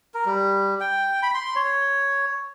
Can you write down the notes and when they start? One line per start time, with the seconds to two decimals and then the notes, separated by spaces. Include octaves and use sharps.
0.14 A#4
0.26 G3
0.80 G5
1.23 B5
1.34 C6
1.56 C#5